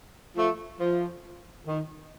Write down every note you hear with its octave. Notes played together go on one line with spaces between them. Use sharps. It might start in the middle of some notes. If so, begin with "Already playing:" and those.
F3 A3
F3
D#3